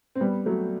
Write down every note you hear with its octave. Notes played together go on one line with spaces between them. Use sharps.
C4
G3 B3
F#3 A3